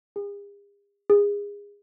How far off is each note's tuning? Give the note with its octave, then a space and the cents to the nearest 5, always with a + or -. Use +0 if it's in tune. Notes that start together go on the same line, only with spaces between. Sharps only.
G#4 -45
G#4 -30